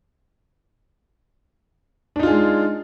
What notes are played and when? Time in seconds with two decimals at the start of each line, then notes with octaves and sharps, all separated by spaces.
2.16 D4
2.19 D#4
2.23 F4
2.27 G#4
2.30 G#3